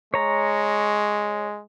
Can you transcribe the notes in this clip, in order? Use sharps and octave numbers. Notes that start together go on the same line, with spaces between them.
G#3 C#5 A#5